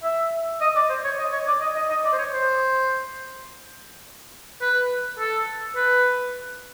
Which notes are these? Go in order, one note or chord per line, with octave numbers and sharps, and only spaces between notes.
E5
D#5
D5
C5
C#5
D#5
C#5
D5
D#5
D#5
D#5
D5
C5
C#5
C5
B4
A4
B4